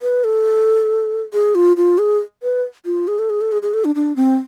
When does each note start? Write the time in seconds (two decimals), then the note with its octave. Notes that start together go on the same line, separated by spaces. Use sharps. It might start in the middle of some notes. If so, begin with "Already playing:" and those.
0.02 B4
0.24 A4
1.33 G#4
1.55 F4
1.77 F4
1.98 G#4
2.43 B4
2.85 F4
3.08 G#4
3.19 A4
3.30 G#4
3.41 A4
3.52 G#4
3.62 G#4
3.74 A4
3.85 D4
3.95 D4
4.16 C4